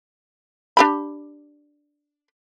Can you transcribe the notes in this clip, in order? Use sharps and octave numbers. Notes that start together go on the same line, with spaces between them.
D4 G4 B5